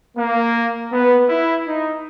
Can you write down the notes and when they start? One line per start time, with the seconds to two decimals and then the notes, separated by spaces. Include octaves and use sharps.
0.17 A#3
0.92 B3
1.29 E4
1.67 D#4